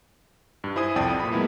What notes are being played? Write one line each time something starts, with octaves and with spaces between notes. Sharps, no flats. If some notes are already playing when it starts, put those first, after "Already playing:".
G2
E4 C5 G#5 D#6
C2 F2 D5 G5 A5 D#6
A#2 B5
F#3 G#3 A#3 B3 E4